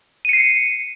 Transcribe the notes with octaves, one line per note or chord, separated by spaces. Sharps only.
C7 C#7 D#7